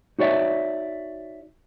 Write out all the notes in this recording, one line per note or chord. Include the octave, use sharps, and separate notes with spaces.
D#4 F#4 C#5 D5 E5